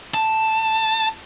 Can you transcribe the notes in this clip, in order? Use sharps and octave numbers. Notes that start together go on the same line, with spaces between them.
A5